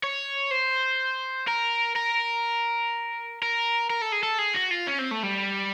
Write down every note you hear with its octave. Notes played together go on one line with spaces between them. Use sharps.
C#5
C5
A#4
A#4
A#4
A#4
A4
G#4
A4
G#4
F#4
F4
C#4
C4
A3
G3